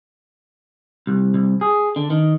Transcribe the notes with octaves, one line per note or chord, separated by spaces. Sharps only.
C2
C2
G#4
D3
D#3